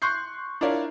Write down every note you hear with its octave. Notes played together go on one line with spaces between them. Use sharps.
C6 C#6 F#6 G6 C7
D4 E4 F4 A#4 C#5 D5